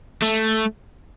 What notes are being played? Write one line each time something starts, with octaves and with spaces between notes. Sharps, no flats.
A3